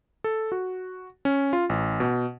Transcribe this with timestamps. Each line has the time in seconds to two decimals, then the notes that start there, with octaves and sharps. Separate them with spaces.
0.24 A4
0.52 F#4
1.25 C#4
1.53 F4
1.69 A1
2.00 B2